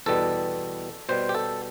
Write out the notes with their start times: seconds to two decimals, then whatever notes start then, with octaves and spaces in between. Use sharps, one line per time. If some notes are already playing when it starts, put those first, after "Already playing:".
0.06 E2 B2 G3 A4
1.09 B2 G3 C5
1.29 G4
1.34 A4